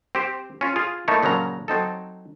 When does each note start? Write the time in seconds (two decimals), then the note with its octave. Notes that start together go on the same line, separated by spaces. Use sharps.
0.15 C4 G4 C5
0.61 C#4 F4
0.76 F4 G#4
1.08 A3 A#3 D#4 E4 A4 C#5
1.23 A#2 C#3 F3 F#3 A#5
1.68 F#3 C4 D#4 A4